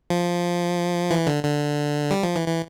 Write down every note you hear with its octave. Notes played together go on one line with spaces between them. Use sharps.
F3
E3
D3
D3
G3
F3
E3
E3